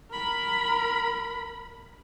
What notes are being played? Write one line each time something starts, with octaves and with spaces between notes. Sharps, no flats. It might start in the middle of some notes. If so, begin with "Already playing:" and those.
A#4 B5